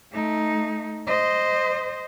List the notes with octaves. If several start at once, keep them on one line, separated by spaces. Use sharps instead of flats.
A3 D#4
C5 D#5